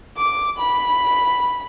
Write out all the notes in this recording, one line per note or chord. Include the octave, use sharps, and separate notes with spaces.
D6
B5